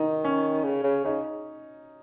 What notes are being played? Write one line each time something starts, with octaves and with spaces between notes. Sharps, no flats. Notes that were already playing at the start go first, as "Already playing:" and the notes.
Already playing: D#3 D#4
C#4
C#3
C#3
C#3 D#4